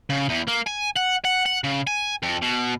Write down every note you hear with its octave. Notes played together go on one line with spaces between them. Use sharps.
C#3
E2
A#3
G#5
F#5
F#5
F#5
C#3
G#5
F2
B2